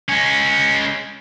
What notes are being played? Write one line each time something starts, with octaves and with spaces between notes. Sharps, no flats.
G#3 C#4